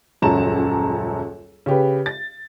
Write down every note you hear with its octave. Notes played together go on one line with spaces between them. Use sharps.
D#1 C#2 F#2 A5 A#5 E7
C#3 G4 B4
A6